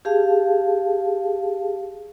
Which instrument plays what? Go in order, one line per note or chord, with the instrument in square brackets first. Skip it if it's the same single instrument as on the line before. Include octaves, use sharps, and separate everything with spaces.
[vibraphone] G4 G#4 F5 A5